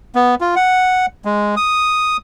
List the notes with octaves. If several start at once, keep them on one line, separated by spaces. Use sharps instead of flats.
B3
F4
F#5
G#3
D#6